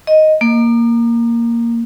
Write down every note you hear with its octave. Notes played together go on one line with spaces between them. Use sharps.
D#5
A#3